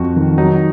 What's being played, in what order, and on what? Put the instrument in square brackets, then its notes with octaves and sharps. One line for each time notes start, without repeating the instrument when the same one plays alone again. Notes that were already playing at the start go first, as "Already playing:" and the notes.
Already playing: [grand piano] F2 [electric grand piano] F#4
[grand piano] D#3
[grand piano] F#3 [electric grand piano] D#4